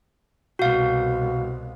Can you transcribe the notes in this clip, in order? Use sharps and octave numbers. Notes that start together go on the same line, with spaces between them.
C2 B2 F#4 F5